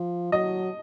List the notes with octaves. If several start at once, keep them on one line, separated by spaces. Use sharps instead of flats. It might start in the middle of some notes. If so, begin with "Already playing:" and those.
Already playing: F3
F#3 D#5